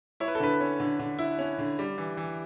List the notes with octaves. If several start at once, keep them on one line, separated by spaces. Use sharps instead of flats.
E4 C#5
B4
A4
D3 B4
C#4
D3
D3
E4
C#4
D3
G3
E3
E3